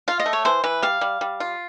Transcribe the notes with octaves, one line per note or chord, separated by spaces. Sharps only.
F4 F5
D#5
A3
C#5
E3 C5
E3 B4
G3 F5
G3
G3
F4